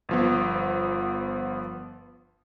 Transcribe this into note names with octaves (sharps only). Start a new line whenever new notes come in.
G1 F3 B3